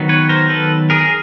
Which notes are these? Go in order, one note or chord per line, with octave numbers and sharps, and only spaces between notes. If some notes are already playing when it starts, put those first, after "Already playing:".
Already playing: D#3 F#3 B3
B4 C#5
A#4 C5
A4 B4
G#4 A#4